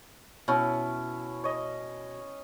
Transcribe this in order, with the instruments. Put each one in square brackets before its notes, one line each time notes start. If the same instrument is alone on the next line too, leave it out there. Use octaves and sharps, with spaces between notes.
[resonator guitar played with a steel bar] B2 [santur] C#4 E4 C#5
[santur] C#5 D#5